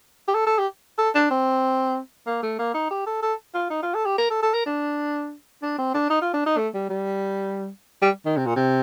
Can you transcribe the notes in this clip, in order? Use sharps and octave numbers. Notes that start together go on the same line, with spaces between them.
G4
A4
A4
G4
A4
D4
C4
A#3
A3
A#3
D#4
G4
A4
A4
F4
D#4
F4
A4
G4
A#4
A4
A4
A#4
D4
D4
C4
D4
D#4
F4
D4
D#4
A3
G3
G3
G3
D#3
C3
A#2
C3